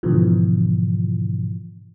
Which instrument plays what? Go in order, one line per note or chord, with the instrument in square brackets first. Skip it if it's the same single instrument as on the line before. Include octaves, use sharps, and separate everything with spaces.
[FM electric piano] G#2 B2 D3 E3 F3